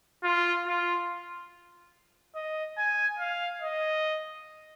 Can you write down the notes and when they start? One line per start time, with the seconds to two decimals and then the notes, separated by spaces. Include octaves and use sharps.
0.24 F4
0.67 F4
2.35 D#5
2.77 G#5
3.19 F5
3.62 D#5